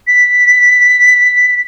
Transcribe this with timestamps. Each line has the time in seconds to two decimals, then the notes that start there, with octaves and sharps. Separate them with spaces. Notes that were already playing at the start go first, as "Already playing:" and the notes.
0.07 B6